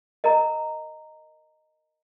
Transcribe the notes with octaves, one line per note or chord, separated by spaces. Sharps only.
A#4 D#5 A#5